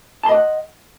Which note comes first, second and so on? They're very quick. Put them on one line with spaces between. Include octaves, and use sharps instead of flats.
A5 C6 D#5 D5 F#5